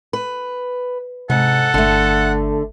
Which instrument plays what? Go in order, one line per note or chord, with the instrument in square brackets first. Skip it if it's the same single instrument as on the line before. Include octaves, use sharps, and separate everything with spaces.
[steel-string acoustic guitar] B4
[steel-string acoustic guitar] G#2 [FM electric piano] C3 [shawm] A4 [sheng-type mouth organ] F#5
[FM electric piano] G1 [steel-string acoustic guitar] D3 A3